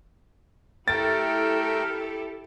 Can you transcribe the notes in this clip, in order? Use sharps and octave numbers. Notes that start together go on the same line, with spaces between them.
A3 E4 G4 A4 A#4 G5 A6